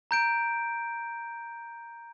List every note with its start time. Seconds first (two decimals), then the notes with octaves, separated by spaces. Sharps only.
0.11 A#5 G6 D7